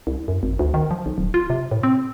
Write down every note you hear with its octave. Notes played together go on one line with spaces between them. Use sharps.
C2
F#2
G#1
D2
D#3
F3
B1
D1
F4
C3
A2
C4